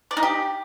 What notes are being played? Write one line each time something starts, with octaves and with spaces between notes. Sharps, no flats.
D5
D#4
G4